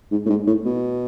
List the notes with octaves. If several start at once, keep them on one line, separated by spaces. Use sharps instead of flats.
G#2
A2
G#2
A2
B2